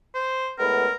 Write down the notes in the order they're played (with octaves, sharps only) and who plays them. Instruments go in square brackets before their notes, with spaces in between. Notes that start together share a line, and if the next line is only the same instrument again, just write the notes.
[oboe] C5
[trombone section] A2 G#3 B3 [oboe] A#4